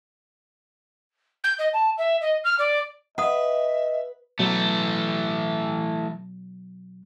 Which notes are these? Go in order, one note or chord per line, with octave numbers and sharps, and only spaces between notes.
G6
D#5
A5
E5
D#5
F6
D5
B4 D#5 E5 F#5 D#6
B2 E3 F#3 A3